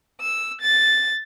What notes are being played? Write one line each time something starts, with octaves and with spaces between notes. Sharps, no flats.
E6
A6